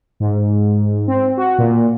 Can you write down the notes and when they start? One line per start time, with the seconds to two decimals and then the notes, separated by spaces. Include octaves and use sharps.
0.20 G#2
1.08 C4
1.37 F#4
1.58 A#2